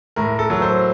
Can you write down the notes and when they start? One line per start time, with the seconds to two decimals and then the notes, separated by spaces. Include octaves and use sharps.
0.16 A2 A#4
0.39 A4
0.50 F#3
0.62 C5